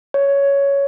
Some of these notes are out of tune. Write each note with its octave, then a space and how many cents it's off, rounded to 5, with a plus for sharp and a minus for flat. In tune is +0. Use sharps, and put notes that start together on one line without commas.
C#5 +10